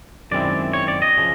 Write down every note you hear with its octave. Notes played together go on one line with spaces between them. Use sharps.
F#2 D#3 G#3 C4 E4 D5
C#5
D5
D#5
C#3 F3